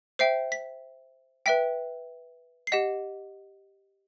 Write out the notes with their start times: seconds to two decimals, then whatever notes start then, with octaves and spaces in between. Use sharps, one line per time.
0.19 C5 E5 G5 C7
0.52 B6
1.46 B4 E5 G5 B6
2.67 C7
2.72 G4 D#5 F#5 B6